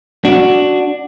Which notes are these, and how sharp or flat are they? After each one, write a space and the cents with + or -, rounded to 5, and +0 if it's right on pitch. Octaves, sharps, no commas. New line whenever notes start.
D4 +0 F#4 +0